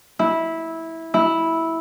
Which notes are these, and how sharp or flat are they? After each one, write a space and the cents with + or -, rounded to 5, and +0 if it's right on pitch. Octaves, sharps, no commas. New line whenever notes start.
E4 -15
E4 -10